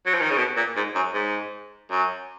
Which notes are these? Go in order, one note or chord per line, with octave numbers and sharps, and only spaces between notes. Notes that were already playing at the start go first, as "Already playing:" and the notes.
F#3
F3
D#3
C#3
B2
A#2
G#2
F#2
G#2
F#2